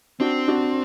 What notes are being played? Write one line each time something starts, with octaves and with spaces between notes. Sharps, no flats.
C4 D4 F#4
D4 F#4